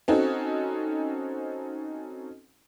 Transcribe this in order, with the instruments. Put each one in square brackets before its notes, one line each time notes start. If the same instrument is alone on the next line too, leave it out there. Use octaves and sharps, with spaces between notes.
[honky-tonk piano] C4 C#4 D#4 F#4 A4